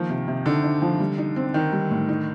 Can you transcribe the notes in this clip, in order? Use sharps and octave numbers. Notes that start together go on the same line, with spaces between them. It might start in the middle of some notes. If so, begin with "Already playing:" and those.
Already playing: D#3 F3 A#3
C3
C3
D3 D#4
D#4
F3
G3
D#4
C4
D#3 D#4
G3
A2
D#4